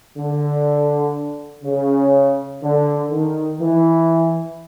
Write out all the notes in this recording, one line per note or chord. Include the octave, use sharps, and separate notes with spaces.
D3
C#3
D3
D#3
E3